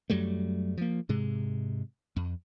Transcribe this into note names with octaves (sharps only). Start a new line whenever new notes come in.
F#2 F#3 G3 A3
F3 A#3
G#2 C3 G#3
F2